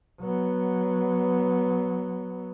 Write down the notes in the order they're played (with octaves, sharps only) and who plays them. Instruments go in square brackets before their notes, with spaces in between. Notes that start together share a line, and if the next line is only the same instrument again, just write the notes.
[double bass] F#3 B3